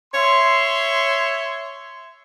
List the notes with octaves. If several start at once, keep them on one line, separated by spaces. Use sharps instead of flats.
C#5 E5 C6